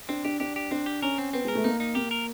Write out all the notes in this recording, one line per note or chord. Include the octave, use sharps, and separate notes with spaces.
C4 D4
D4 G4
D4 G4
G4
C4 D4
G4
C#4 A#4
C4
B3 C4
G#3 A#4
A3
A#3 D#4
D#4
A#3 G4
A#4